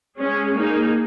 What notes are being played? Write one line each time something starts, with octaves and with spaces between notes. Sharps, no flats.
G#3 C#4 G#4
A#3 D#4 G#4